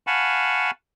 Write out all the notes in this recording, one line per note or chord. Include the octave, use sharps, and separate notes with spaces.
F5 F#5 G#5 A5 B5 C#6